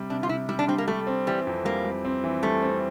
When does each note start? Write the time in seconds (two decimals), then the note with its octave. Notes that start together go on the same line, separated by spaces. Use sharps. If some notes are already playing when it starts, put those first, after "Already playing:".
Already playing: C3 G3
0.10 C3 D4
0.23 F4
0.29 C3 E4
0.49 G3 E4
0.59 D4
0.68 G3 C4
0.78 A#3
0.88 G3 A3
1.07 C4
1.27 E3 G3
1.47 F2
1.65 G3 A#3
1.84 G3
2.05 C4
2.24 E3
2.43 G3 A3
2.62 C4